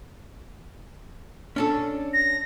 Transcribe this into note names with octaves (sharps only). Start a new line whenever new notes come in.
C#4 D4 A4
A#6